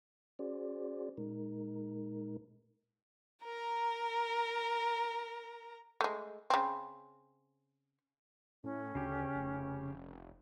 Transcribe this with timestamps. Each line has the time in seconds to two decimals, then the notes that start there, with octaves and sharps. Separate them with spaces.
0.39 C#4 F#4 G#4 C5 D5
1.17 A#2 G#3 D#4 A#4
3.44 A#4 A#5
6.01 G#3 A3
6.50 C#3 C4
8.64 A2 C#4
8.95 D2 C#3 G4
9.35 F1